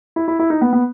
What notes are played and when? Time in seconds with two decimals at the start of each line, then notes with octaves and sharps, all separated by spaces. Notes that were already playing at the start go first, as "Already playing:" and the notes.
0.16 E4
0.28 E4
0.39 E4
0.50 D#4
0.61 B3
0.73 B3